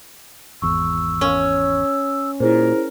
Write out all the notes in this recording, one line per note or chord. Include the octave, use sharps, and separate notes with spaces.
G#1 E2 C#6 E6
C#4
A#2 E4 G#4 A#4 C5